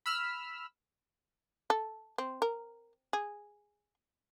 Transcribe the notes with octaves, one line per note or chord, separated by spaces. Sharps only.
B5 E6 F6
A4
C4
A#4
G#4